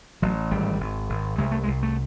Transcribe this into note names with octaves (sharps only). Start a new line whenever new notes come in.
A1 F#3
G#1 G3
G#1
G#1
C2 G#3
A3
G#3
C2
A3